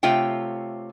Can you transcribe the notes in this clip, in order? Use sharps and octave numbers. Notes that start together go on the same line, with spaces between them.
C3 A3 F4 C#5 G5